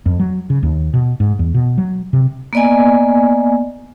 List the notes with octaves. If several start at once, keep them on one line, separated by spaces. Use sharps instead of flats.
F2
F#3
C#3
D#2
B2
G#2
E2
B2
F#3
C3
A#3 B3 D5 D#5 G#5